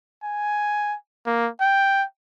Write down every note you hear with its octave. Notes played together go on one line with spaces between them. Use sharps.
G#5
A#3
G5